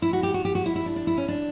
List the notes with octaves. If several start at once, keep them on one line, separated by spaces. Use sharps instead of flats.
E4
F#4
G4
F#4
G4
F#4
E4
E4
D4
D4
E4
C#4
D4